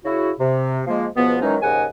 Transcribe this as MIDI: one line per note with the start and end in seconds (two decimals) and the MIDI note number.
0.04 0.30 49
0.04 0.30 64
0.04 0.30 66
0.39 0.81 48
0.87 1.05 53
0.87 1.05 56
0.87 1.05 58
1.16 1.42 37
1.16 1.42 47
1.16 1.42 53
1.16 1.42 59
1.42 1.56 51
1.42 1.56 52
1.42 1.56 54
1.42 1.56 56
1.42 1.56 61
1.42 1.56 63
1.62 1.85 39
1.62 1.85 44
1.62 1.85 49
1.62 1.85 75
1.62 1.85 78
1.62 1.85 80